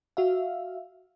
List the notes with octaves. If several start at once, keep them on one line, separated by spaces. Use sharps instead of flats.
F#4 E5 F5